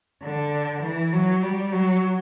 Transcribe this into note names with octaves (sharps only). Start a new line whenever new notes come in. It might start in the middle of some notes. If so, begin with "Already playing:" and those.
D3
E3
F#3
G3
F#3